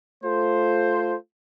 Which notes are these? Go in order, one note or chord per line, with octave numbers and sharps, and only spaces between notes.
A3 F4 A4 C5